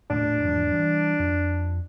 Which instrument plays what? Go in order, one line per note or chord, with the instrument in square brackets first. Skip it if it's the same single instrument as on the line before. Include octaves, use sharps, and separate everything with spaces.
[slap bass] D#1 A2 [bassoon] D4
[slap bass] E2 G#2 F3
E3 G3
F2